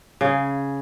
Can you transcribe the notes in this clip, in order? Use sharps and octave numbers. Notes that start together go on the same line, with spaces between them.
C#3 G#4